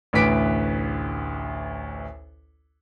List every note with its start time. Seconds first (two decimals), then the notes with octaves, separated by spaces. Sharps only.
0.13 A1 D2 B4 D6 B6 D7